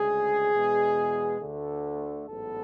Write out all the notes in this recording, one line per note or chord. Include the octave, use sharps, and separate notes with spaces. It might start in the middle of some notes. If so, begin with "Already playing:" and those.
Already playing: D2 C#3 G#3 G#4
E2 B2 G#3 B3
D2 D3 A3
A1 G#2 F#3 B3 A4